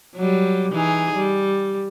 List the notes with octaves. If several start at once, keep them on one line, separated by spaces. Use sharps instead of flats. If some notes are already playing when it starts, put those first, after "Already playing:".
F#3 G3
E3 D#4 G#4
G3